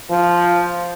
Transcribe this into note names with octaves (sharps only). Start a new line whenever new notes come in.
F3